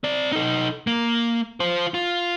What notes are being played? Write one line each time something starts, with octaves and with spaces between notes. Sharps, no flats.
C4 D5
D#4 A4
A#3
F4 C5
F4